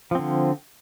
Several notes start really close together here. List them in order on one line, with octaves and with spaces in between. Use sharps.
F3 C4 D3